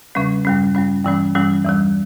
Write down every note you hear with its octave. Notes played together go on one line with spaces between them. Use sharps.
E2 C#3 G3 C#4
G2 G3 C#4
G2 G3 C#4
G2 E3 G3 C#4
G2 E3 G3 C#4
E2 E3 G3